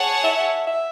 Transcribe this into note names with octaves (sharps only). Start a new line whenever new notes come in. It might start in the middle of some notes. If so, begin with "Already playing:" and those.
Already playing: G#4 C#5 F#5 A5
E5
E5